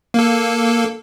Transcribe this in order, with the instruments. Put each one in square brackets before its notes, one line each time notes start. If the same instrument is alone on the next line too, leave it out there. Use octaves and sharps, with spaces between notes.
[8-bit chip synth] A#3 A4